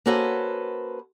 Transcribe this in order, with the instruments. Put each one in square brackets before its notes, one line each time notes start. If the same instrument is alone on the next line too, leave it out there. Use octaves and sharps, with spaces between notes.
[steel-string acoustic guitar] A#3 C#4 F#4 A4 B4 C5